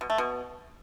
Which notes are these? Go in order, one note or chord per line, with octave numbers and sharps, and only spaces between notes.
B2
A3
B2